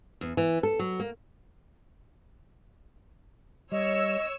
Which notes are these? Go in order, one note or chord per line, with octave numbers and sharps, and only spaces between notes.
E2
E3
A4
F#3
A#3
G3 C#5 D#5 E6